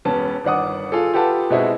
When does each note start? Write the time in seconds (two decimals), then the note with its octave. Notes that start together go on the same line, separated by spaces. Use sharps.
0.05 E1 B3 C#4 A5
0.44 G1 D#3 D5 F#5 D#6
0.92 F4 G#4 A4
1.13 F4 G4 A4 B4 F#5 A5
1.50 B2 G#3 C4 D#4 E4 F#4